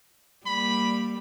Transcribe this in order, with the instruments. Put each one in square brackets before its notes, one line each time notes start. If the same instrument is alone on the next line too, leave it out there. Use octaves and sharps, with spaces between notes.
[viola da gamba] G3 A#3 [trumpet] B5